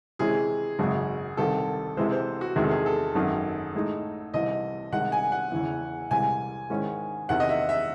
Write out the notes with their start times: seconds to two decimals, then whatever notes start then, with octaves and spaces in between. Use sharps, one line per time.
0.19 C3 E3 G#3 C#4 E4 G#4
0.79 G#1 F#2 C#3 G#3
1.37 C2 C3 D#3 A4
1.97 C3 E3 G#3 C5
2.12 C5
2.41 F#4
2.56 E2 C3 D#3 G#3 G#4
2.63 A4
2.71 G#4
2.86 A4
3.15 G#1 F#2 D#3
3.75 A2 G#3 D#4
4.33 C2 C3 E3 D#5
4.92 C2 C3 D#3 G#3 D#4 F#5
5.12 G#5
5.32 F#5
5.52 E2 C#3 E3
6.10 C2 C3 E3 G#3 G#5
6.70 G#2 D#3 G#3 C#4 E4
7.29 E2 C3 D#3 F#5
7.40 D#5
7.49 E5
7.69 E5